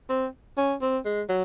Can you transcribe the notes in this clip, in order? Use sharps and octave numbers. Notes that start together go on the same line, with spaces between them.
C4
C#4
C4
G#3
F#3